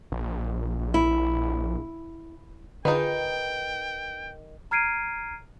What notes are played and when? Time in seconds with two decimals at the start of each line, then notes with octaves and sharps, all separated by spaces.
0.12 A#1
0.94 E4
2.85 D3 D#3 D#4 F4 G#4 B4 G5
4.71 A#5 F6 G#6 C7 D7 D#7